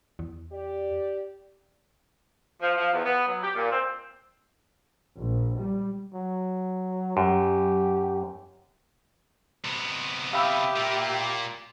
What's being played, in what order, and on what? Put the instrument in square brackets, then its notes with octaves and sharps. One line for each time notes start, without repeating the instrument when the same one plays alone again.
[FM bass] E2
[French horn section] G4 D5
[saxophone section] F3
F3
E2
B3
F#3
G4
A#2
C4
[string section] A#1
G3
[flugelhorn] F#3
[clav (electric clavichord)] F#2 [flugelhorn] G4
[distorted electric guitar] C3 B3
[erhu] G4 [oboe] E5 [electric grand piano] F5 B5 E6
[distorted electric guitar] A#2 A#3